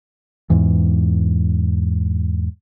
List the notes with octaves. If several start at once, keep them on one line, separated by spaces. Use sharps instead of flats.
E2 G#2 E3